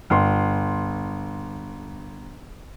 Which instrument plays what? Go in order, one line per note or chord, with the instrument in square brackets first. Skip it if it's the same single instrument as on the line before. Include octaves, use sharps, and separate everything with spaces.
[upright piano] G1 C6